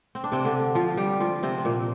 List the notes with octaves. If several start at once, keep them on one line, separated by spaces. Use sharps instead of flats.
C4
D4
C3 C4
D3 D4
F3 F4
G3 G4
F3 F4
C3 C4
C4
A#2 A#3